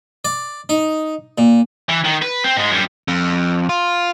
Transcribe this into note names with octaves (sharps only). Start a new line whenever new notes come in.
D5
D#4
A#2
E3
D#3
B4
C4
G#2 G#3
F#2 G3
F2
F4